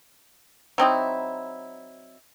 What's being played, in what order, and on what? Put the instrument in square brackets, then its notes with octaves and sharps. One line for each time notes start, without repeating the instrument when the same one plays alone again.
[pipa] F#3 C4 D#4 E4